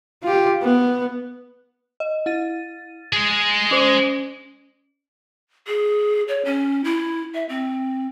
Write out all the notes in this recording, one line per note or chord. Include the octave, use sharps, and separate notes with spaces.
F4 G4
B3
D#5
E4 A6 D#7
G#3 G#4 A6 C7
C#4 C5 F#7
G#4
C#5
C#4
E4
E5
C4